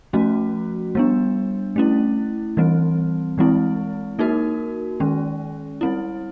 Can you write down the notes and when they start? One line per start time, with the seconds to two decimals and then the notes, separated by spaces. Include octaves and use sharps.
0.13 F3 A3 C#4 F#4
0.95 G3 B3 D4
1.76 A3 C#4 E4
2.57 E3 G3 C4
3.38 E3 G#3 C4 E4
4.19 A#3 D#4 F#4 A#4
5.00 D#3 G#3 C#4
5.81 G3 C4 E4